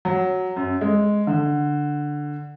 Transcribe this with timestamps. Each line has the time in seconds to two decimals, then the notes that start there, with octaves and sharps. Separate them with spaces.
0.05 F#3
0.57 F#2
0.81 G#3
1.27 D3